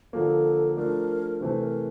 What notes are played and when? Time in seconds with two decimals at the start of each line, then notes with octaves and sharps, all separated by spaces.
0.13 D3 F3 A#3 A4
0.77 F3 A3 D4 A#4
1.41 C3 E3 A3 C5
1.62 A#4